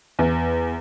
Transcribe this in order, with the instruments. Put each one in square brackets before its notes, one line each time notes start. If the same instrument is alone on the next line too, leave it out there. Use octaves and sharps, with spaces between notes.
[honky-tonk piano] E2